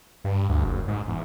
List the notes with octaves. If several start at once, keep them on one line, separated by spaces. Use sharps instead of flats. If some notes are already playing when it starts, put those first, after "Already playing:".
G2
D2
F#1
G#2
E2